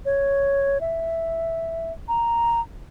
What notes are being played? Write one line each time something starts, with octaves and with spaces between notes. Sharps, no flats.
C#5
E5
A#5